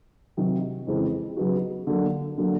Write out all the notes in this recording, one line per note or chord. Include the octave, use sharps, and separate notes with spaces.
C3 D#3 F#3
F2 C#3 E3 G#3 C4
C#3 F#3 B3 D#4 F#4
D3 F#3 A#3
D3 F#3 A#3